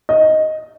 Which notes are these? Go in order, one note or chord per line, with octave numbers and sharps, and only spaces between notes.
D#5